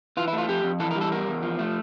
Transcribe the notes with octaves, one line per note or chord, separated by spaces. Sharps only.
E3 F4
E4
A3
F4
F2 G4
F2
E3 A4
A#4
G3
A4
E2 A#4
E2
F3
A3